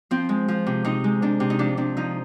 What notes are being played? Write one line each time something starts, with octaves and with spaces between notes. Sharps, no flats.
F3 C4
G#3
F3
C3
C3 D#4
G#3
C3 D4
C3
D#4
F3 D4
C3 D4
F3 D#4